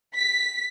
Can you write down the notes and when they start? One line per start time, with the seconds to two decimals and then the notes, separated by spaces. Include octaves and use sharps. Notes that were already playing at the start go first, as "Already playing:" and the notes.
0.16 B6